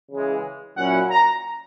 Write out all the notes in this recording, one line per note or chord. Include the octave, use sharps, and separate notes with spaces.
C#3 E3 G#3
A#2 F#3 C#4 E4 F#5
A#5